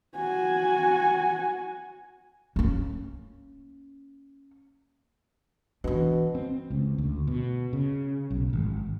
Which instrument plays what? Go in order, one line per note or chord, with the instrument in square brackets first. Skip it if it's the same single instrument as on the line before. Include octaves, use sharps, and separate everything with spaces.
[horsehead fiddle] F#4 G#5
[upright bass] A#3 C#4
[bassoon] B2 [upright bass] E3 D4
[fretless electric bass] C4
C#2
D2
B2
C#3
B1
G#1